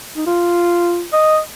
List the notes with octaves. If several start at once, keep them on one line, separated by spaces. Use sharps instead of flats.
D#4
F4
D#5